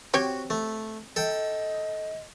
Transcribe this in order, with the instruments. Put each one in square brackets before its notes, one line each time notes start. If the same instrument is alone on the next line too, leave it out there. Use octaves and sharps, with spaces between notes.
[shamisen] C4 G4 C#5 [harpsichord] F#4
[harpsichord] A3
[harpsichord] A4 G5 [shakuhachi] D#5